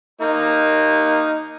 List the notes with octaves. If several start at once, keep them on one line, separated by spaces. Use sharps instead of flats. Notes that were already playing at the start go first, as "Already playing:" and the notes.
A#3 D#4